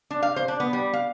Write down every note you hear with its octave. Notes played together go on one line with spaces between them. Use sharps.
D4
F5
C5
D4
B3
G3
F5